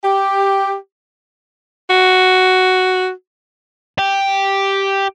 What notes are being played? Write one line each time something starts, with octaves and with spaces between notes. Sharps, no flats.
G4
F#4
G4